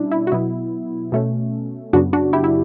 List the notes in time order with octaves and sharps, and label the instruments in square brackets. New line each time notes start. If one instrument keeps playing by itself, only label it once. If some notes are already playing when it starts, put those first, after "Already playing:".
Already playing: [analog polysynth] B2 G3 C#4 D4 E4
E4
F#4
B2 F#3 B3 E4
B2 A3 C#4
F#2 C#3 F#3 B3 D4 F#4
D4 F#4
E4 G4
E4